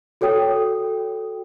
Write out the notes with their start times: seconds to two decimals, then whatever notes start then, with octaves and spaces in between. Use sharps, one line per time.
0.21 F#4 A4 C#5 G5 D#6